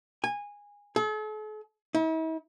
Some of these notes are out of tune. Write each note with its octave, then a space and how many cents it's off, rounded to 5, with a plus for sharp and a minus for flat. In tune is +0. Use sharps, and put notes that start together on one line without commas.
G#5 -20
A4 -45
E4 -45